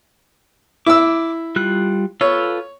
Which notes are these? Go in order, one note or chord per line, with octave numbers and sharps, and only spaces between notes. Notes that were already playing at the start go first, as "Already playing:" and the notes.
E4 D6 E6
G3 F4 F#6
F4 A4 B4 C#5